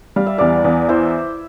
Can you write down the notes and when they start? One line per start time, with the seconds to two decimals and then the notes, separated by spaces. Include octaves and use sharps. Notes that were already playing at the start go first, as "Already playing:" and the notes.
0.16 G3 F5
0.27 E5
0.38 E2 D5 F5
0.64 E2
0.88 E4 C5 E5